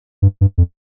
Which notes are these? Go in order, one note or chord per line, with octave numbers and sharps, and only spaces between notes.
G2
G2
F2